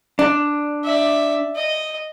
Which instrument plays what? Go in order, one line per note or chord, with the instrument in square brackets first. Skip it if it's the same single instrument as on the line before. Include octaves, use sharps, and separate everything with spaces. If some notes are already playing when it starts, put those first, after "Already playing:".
[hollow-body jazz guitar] D4
[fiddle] D5 E5
D#5